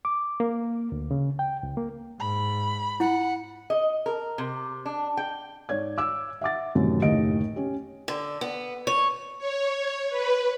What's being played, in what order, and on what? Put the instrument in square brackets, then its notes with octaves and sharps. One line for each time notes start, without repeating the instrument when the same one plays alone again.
[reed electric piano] D6
A#3
D2
C#3
G5
C#2
A#3
[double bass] G#2 [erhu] B5
[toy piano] E4 [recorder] F#5
[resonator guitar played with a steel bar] D#5
A#4
C3
D4
G5
[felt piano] G#2 C#5 D5 G#6
D6 E6
E5 F#5 D6 A6
F#2 A2 C3 D#3 E3
F#1 D#2 A2 G4 D#5 D7
C#4 G4
[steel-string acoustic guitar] D3
B3
C#5
[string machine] C#5
B4